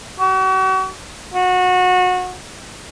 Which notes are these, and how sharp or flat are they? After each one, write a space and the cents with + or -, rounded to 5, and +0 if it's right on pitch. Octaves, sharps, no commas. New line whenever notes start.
F#4 +40
F#4 -25